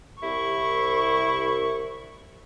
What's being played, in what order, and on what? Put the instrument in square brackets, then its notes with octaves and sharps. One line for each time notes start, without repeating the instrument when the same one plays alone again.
[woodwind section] C2 [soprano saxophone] E4 [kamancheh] C#6